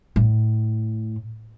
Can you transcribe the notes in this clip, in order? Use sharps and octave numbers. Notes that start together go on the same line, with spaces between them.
A2